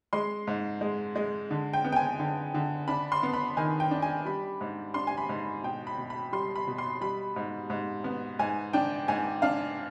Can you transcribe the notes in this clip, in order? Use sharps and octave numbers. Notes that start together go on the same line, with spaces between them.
G#3 C6
G#2
G#3
G#3
D3
G5
B3
G5
G#5
D3
D3
D4 B5
C6
B3
B5
D#3 G#5
G5
D4
G#5
G3 B5
G#2
D4 C6
G#5
B5
G#2
B2 G5
B5
B2
B5
G3 C6
B5
B2
C6
G3 B5
G#2
G#2
B3
G#2 G#5
D4 G5
G#2 G#5
D4 F5